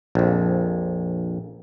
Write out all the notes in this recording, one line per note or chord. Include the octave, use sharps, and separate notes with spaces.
A#1 F2